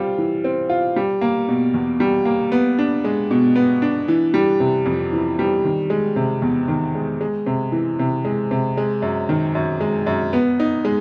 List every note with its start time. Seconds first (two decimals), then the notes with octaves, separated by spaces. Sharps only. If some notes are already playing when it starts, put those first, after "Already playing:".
Already playing: G3 C4 F4
0.18 E3
0.44 C4
0.70 F4
0.96 G3
1.21 A#3
1.48 B2
1.74 E2
2.00 G3
2.25 A#3
2.52 B3
2.79 D4
3.04 G#3
3.31 B2
3.56 B3
3.82 D4
4.08 E3
4.34 G3
4.60 C3
4.86 F2
5.13 E3
5.39 G3
5.65 D#3
5.90 G#3
6.16 C3
6.42 E2
6.68 D#3
6.95 G#3
7.21 G#3
7.46 C3
7.72 E3
7.99 C3
8.25 G#3
8.51 C3
8.77 G#3
9.02 F#2
9.29 D#3
9.55 F#2
9.80 G#3
10.07 F#2
10.33 B3
10.60 D#4
10.85 G#3